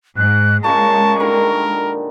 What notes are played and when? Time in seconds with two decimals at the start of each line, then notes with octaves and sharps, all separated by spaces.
0.17 G#2 F#6
0.64 A#2 C#3 G#3 C#4 A5 C#6
1.20 D3 D#3 G3 A#4